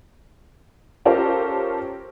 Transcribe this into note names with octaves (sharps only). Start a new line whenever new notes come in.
C#4 F4 G4 A4 A#4 C5